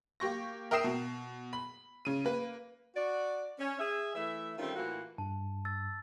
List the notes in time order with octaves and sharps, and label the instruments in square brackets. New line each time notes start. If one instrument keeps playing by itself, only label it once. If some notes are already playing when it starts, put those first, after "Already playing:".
[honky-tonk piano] A#3 G4 C#6 A#6
A#4 E5 G5 D#6 C7 E7
B2
B5
C#3 D#7
A#3 B4
[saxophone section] F#4 D5
C#4
G#4 E5
E3 A3 E5
D#3 G3 A3 C4 C#4 F4
A2 E3 A#3 F4 F#4
[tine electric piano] G2 [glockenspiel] A5
[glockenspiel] E6 A6